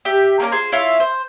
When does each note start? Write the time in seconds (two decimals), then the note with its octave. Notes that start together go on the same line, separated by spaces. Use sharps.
0.05 G4 E5
0.40 A#3 C#4 A#4
0.52 F4 G#4 C5
0.72 E4 F4 C#5 E5
1.00 C5